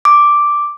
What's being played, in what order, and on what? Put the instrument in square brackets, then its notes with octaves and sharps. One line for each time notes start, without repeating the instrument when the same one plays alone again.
[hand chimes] D6